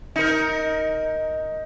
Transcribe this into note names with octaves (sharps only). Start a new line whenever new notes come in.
D#4 A#4